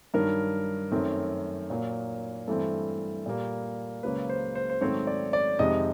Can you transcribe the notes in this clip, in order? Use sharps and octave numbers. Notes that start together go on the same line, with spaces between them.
G2 D#3 F#3 A#4
F#2 D#3 F#3 A3 C4
A#2 F#3 A#3
G2 E3 A3 C4 A4
A#2 G3 A#3
C#2 C#3 F#3 A#3 B4
C5
C5
C5
G#2 D#3 F#3 A3 C4 C#5
D5
D5
F2 C3 D#3 G#3 D#5